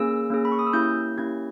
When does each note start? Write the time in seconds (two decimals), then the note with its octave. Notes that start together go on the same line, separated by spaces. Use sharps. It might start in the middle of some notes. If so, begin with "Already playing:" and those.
Already playing: A#3 C#4 G#4 E6
0.30 A#3 C#4 G#4
0.45 B5
0.52 C#6
0.59 D#6
0.67 E6
0.73 A#3 C#4 E4 G4 G6
1.17 A#3 C#4 E4 G4 G#6